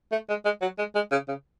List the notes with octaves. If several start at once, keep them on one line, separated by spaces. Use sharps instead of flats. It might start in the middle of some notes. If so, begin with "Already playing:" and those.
A3
G#3
G#3
F#3
G#3
G#3
C#3
C#3